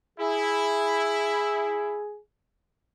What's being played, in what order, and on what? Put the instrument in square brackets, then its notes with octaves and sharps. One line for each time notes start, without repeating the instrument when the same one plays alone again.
[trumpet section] E4 [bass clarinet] G#4